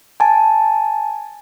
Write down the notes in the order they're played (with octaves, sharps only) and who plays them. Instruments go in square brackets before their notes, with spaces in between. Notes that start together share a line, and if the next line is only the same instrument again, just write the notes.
[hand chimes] G#5 A5